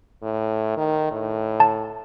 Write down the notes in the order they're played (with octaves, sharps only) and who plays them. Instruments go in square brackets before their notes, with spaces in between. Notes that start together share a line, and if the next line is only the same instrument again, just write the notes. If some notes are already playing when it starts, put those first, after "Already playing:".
[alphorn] A2
D#3
A2
[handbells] A5